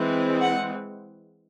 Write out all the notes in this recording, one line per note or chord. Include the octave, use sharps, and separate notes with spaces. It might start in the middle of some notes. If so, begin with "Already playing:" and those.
Already playing: E3 G#3 C4
F#5